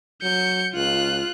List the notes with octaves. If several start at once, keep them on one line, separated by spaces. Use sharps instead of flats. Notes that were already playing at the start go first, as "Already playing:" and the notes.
F#3 G6 C#7
C#2 F4 F#6